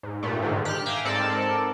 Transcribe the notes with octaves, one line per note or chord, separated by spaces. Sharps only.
G#2
G2 A#2 A3
G#2 D3 D#3
G4 F6 F#6
E5 F5 G5 G#5 A#5
G#2 C4 A4 A#4 D5 A5